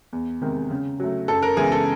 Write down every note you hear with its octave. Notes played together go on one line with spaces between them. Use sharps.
E2
C3 D#3 G#3
C#3
F#3 A3
F#2 A4
A#4
C#3 E3 G#3 B3 G#4
A4